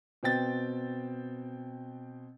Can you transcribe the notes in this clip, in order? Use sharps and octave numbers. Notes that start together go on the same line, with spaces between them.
B2 C4 G5 A6